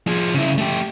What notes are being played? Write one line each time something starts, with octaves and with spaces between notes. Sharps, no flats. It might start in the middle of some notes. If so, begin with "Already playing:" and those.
F3 G#4
C#3 E4
A3 G4